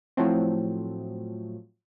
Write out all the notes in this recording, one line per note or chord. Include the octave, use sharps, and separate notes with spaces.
A2 F3 F#3 A3 C4